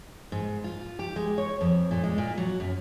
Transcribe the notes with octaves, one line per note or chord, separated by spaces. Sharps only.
G#2
F4
G4
G#3
C#5
F2
A#2
G#3
A#2
F#3
F#2